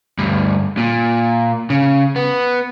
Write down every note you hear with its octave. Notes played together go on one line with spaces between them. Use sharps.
D2 G2
A#2
C#3
B3